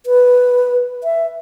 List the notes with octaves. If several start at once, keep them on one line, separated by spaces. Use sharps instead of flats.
B4
E5